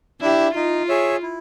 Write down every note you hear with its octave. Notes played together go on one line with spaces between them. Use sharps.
D4 E4 G4
D#4 F4
G#4 C#5 E5
E4